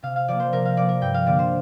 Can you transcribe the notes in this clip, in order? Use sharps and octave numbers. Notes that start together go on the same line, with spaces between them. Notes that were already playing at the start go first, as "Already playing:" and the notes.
C3 F5
F5
F3 A#3 D5
C5
C3 A#4
F5
F3 A#3 D5
A#4
G2 G5
F5
D3 G3 A#3 D5
C5